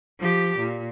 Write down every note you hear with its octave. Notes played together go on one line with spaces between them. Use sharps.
F3 G4
A#2